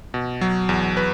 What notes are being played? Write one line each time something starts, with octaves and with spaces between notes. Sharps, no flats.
B2
F#3
E2
B4